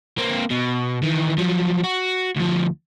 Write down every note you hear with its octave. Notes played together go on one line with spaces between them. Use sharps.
A#3 C4
B2
D#3 E3
F3 F#3
F#4
D2 F3